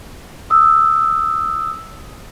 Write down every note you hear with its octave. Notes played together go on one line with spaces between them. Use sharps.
D#6 E6